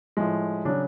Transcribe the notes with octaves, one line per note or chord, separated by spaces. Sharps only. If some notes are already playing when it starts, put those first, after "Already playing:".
A2 F3 G#3
C#3 F#3 D4